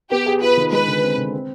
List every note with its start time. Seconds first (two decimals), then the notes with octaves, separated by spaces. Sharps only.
0.11 B3 G4
0.26 G#4
0.41 F4 B4
0.57 D#3
0.72 G#3 B4
0.87 D3
1.02 C4
1.18 D3
1.33 C4